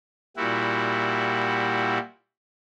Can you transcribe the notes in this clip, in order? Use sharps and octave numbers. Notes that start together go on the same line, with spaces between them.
A#2 G3 E4 F#4